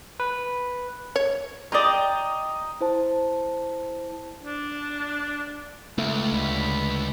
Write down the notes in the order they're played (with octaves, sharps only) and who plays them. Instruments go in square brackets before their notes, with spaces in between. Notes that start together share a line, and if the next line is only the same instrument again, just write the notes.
[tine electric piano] B4
[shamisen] C#5
[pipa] F4 D5 [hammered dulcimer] D#5 G5 A#5
[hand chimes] E4 C5 A5
[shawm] D4
[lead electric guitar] C#2 [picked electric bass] A3
[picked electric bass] D2 [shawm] B5